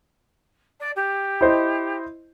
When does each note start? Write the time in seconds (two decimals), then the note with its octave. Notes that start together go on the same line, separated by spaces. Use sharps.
0.80 D5
0.96 G4
1.41 E4 C5 D#5